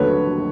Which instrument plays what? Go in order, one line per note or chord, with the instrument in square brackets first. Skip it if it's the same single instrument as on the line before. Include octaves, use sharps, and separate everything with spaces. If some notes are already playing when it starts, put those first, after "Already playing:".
Already playing: [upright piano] D#2 D3 F#3 A3 B4 C#5